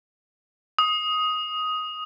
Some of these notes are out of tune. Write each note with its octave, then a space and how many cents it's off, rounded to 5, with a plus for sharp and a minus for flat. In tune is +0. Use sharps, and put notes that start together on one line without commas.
D#6 +5